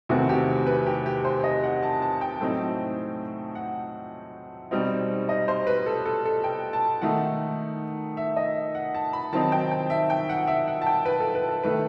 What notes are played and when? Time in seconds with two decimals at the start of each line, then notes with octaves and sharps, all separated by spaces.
0.09 E2 C3 D#3 A3 C4 F#4
0.29 G4
0.66 B4
0.86 G4
1.06 G4
1.25 C5
1.44 D#5
1.63 F#5
1.83 A5
2.02 A5
2.21 G5
2.41 A2 F#3 A3 C4 D#4
3.55 F#5
4.71 B2 G3 C4 D#4
5.29 D#5
5.48 C5
5.67 B4
5.86 A4
6.06 A4
6.25 A4
6.44 G5
6.73 A5
7.02 D#3 A3 D#4 F#5
8.17 E5
8.37 D#5
8.75 F#5
8.94 A5
9.13 B5
9.33 D#3 F#3 C4 D#4 A5
9.52 G5
9.71 G5
9.90 E5
10.10 G5
10.29 F#5
10.48 E5
10.68 F#5
10.82 A5
10.87 G5
11.05 B4
11.20 A4
11.35 B4
11.49 A4
11.63 D#3 A3 B4